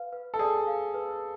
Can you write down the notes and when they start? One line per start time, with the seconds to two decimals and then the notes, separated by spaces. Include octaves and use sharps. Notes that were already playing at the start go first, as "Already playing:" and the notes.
Already playing: B4 F5
0.13 B4
0.34 A4
0.39 G#4 D5
0.67 F5
0.94 B4